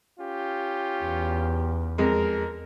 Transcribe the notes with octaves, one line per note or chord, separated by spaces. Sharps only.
C#4 F4 G4
E2
F2 G#3 A#4